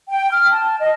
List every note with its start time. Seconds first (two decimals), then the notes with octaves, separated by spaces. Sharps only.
0.09 G5
0.31 F6
0.51 A5
0.80 D#5